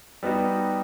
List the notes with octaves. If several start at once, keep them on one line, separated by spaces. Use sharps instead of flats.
G3 B3 D#4 F#4